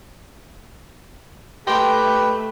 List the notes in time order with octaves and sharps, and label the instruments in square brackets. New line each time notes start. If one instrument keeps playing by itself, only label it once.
[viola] A3 [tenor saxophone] G4 [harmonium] B4 [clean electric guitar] D#5 G5 C6